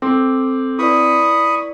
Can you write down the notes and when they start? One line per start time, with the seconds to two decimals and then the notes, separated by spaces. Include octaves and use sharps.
0.02 C4 A4 D6
0.79 E4 B4 D5 B5 C#6 D#6